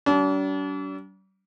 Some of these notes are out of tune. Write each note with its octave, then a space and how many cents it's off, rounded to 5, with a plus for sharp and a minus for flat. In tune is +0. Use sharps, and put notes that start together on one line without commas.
G3 -45 D4 -40